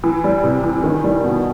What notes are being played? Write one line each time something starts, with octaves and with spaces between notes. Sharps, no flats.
E3
G3
C3
E3
D#3
G3
B2